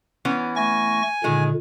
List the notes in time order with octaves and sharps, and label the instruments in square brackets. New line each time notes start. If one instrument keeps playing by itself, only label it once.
[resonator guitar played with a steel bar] E3 B3 C#4
[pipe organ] A3 C#6 A#6 [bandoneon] G#5
[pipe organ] A#2 D3 [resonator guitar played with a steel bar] D#3 G#3